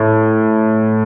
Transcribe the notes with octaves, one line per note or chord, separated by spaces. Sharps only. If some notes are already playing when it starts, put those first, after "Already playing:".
Already playing: A2